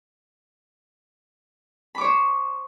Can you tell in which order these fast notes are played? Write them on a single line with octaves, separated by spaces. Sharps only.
B5 D6 C#5 C5